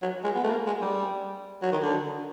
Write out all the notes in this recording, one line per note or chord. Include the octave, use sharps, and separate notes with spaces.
F#3
G#3
B3
A3
A#3
G#3
G3
F#3
D#3
D3